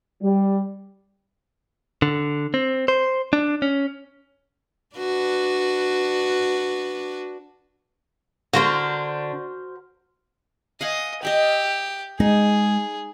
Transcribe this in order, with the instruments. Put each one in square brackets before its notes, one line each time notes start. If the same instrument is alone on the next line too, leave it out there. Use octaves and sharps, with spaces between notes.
[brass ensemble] G3
[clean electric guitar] D3
C4
C5
D4
C#4
[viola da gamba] D4 F#4 B4
[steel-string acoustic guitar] D3 D4 [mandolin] F#4 A#4 C5
[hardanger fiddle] D#5 [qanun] F5 F#5 G#5
[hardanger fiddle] G4 [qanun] D#5 E5 B5
[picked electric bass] G#3 [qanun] D#4 [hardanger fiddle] G#4